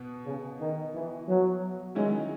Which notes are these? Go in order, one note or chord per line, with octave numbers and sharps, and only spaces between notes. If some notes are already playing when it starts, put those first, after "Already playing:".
Already playing: B2 B3
C#3
D#3
E3
F#3
D#3 F#3 G#3 C#4 E4